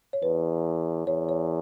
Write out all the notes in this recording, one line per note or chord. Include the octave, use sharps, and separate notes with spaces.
C#5
E2 B4
E2 C#5
C#5